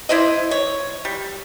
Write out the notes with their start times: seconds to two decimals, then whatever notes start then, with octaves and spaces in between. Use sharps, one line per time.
0.09 E4 C5 D5 D#5
0.51 C#5
1.05 G3